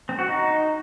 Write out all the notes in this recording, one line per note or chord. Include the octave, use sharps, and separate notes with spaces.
C4
F#4
D#4